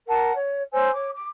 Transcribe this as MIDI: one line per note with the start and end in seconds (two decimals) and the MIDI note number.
0.08 0.34 70
0.08 0.34 78
0.08 0.34 81
0.34 0.64 73
0.72 0.91 72
0.72 0.91 73
0.72 0.91 80
0.72 0.91 88
0.92 1.09 73
0.92 1.09 86
1.14 1.28 86